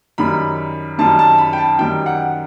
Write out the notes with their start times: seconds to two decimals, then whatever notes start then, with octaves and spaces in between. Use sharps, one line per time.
0.18 F#2 D#3 G3 B5
0.98 F#2 D#3 G3 A5
1.19 A5
1.38 B5
1.53 G5
1.58 A5
1.79 F#2 D#3 G3 G5
2.06 F#5